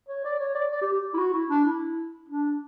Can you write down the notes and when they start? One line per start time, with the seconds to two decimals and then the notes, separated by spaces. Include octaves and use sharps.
0.08 C#5
0.24 D5
0.39 C#5
0.55 D5
0.72 D5
0.81 G4
0.92 G4
1.14 E4
1.18 F#4
1.33 E4
1.49 D4
1.65 E4
2.29 D4